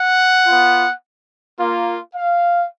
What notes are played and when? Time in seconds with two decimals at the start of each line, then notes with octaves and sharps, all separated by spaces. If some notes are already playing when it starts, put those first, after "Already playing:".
Already playing: F#5
0.47 B3 F4
1.58 A#3 F4
2.15 F5